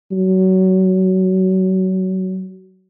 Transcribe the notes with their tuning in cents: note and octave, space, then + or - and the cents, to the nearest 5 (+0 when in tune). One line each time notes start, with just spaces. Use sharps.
F#3 +25